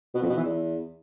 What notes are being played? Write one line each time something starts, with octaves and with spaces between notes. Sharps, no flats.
B2
F2
B2
E3
E2